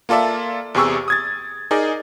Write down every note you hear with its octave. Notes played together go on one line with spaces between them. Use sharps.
A#3 F4 A4 D5 E5
E2 C3 G4 G#4 C#6 E6
D#6 G#6 A6
D#4 G#4 A#4 D5